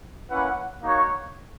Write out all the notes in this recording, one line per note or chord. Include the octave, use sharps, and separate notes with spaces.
A#3 C#4 E4 B4 F#5
A#3 D#4 F#4 C#5